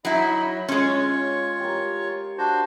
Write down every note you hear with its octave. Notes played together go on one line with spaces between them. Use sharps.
F#3 D#4 E4 D#5 B5
G#3 C#4 F4 C#5 C#6
G4 A#4
D4 F#4 C5